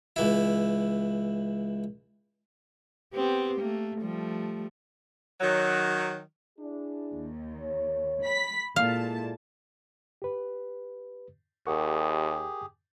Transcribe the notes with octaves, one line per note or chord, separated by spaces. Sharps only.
C#2 E3 E4
B3 C4 G4
A3 A#3
F3 G3 A3
D#3 F#3
D4 E4 G#4
D#2
C#5
B5 B6
A#2 G#3 E4 A4 F5 A5
G4 B4
D#2 G4 G#4 A#4 F#5 C#6